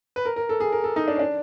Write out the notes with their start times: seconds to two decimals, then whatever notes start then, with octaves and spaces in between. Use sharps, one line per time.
0.16 B4
0.25 A#4
0.36 A#4
0.49 A4
0.60 G#4
0.72 A#4
0.84 A4
0.96 D#4
1.08 D4
1.16 C#4
1.19 D4